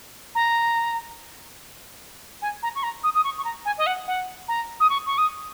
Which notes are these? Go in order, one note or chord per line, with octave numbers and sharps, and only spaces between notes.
A#5
G#5
A#5
C#6
A#5
D#6
D#6
C#6
C#6
A#5
G#5
D#5
F#5
F#5
A#5
D#6
C#6
C#6
D#6